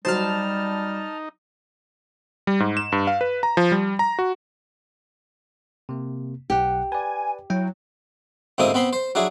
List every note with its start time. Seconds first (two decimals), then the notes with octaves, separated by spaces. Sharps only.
0.05 F#3 G3 D#4 C5 A5 F6
2.47 G3
2.60 G#2
2.77 E7
2.92 G2
3.07 F5
3.21 B4
3.43 A#5
3.57 F3
3.72 G3
3.99 A#5
4.19 F#4
5.89 C3 A#3
6.50 B1 G4 F#5
6.92 B4 D5 G#5
7.50 F#3 E4 G5
8.58 D2 G#2 A#3 C4 E4 D#6
8.74 B3 C4 B5 C6
8.93 C5
9.15 F#3 D4 E4 G#4